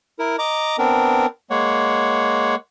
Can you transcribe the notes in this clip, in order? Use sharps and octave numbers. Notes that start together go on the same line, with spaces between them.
E4 A#4
D#5 A#5 D6
B3 C4 D4 A#4
G#3 A#3 C#5 F#5